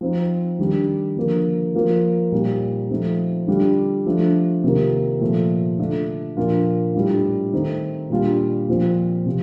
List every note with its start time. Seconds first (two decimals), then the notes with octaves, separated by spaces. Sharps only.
0.01 F3 C4 D#4
0.59 D#3 G3 D4
1.17 D3 F3 A#3
1.74 F3 A#3 F4
2.32 A#2 G3 C4 D#4
2.90 F3 A3 C4 D#4
3.48 D3 G3 D4 F4
4.06 F3 A3 D4
4.64 C3 D#3 A#3 F4
5.21 A#2 F3 A3
5.79 D3 A3 D4 F4
6.37 A#2 F3 A#3 D4 F4
6.94 A2 G3 D4 F4
7.53 D#3 A3 C4 D#4
8.10 A#2 G3 D4 F4
8.69 A#2 F3 C4 F4
9.26 C3 F3